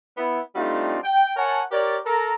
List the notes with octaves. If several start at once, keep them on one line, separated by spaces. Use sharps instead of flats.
B3 E4
G3 A3 C4 D4 D#4 F4
G5
A#4 C#5 F#5 G#5 A5
G4 A#4 C#5 D5
A4 A#4 A#5